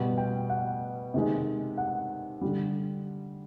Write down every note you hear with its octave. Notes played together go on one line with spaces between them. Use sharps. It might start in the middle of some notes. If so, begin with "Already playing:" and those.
Already playing: B2 G3 F#5
G5
F#5
C3 D#3 G#3
F#5
D3 G3